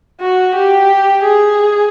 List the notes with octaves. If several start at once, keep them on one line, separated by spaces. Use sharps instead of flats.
F#4
G4
G#4